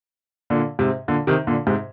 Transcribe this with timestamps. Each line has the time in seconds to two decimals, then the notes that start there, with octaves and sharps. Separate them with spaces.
0.50 A#2 D3
0.79 G#2 C3
1.08 A#2 D3
1.27 C3 D#3
1.47 A#2 D3
1.67 G#2 C3